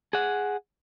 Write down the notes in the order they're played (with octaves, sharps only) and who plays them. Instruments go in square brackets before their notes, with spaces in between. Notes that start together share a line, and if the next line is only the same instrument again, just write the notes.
[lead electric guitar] G#4 F#5